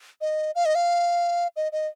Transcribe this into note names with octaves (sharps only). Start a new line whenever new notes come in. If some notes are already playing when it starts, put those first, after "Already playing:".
D#5
F5
D#5
F5
D#5
D#5